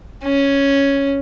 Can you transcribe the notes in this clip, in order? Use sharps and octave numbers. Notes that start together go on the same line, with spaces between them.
C#4